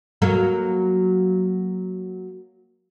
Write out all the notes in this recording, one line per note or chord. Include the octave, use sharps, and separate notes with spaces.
F#3 A#3 A4